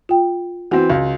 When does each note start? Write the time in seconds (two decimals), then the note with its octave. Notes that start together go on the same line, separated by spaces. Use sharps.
0.09 F4 G5
0.71 E3 C4 F#4 F#5
0.90 C#2